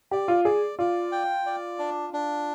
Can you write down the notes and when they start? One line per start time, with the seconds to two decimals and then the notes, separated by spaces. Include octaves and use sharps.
0.11 G4 D5
0.28 F4
0.45 G#4 D5
0.79 F4 D5
1.12 G5
1.46 D5
1.79 D4
2.13 D4